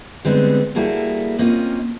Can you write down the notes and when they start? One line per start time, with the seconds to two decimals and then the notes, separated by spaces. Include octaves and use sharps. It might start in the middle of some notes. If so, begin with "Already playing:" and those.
0.25 D3 G3 G#3 B3 C4 D#4
0.75 G3 A#3 E4 F#4 G#4 A4
1.39 A#3 C4 C#4 F4 D#5